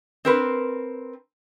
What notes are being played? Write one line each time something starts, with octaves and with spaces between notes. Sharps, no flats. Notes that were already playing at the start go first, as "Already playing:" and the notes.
C4 A#4 B4